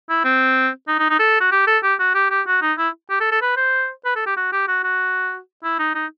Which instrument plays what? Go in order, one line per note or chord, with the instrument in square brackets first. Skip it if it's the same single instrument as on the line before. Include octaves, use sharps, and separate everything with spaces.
[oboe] E4
C4
D#4
D#4
D#4
A4
F#4
G4
A4
G4
F#4
G4
G4
F#4
D#4
E4
G4
A4
A4
B4
C5
B4
A4
G4
F#4
G4
F#4
F#4
E4
D#4
D#4